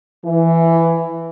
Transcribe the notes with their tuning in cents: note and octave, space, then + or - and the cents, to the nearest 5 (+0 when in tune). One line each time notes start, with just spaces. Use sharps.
E3 +10